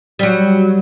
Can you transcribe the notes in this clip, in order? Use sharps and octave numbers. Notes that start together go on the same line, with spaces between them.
F#3 G3